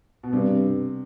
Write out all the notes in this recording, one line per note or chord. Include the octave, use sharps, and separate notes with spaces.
B2
G2 C3